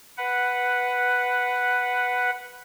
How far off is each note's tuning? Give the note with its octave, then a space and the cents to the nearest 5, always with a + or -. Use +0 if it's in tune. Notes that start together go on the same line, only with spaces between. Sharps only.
B4 +0 F#5 +0